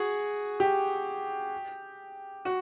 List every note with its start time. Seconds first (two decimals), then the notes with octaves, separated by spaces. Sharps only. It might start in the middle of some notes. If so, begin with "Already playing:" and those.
Already playing: F#4 G#4
0.60 G4
2.45 F#4